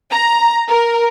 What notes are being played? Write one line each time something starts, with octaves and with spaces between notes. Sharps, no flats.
A#5
A#4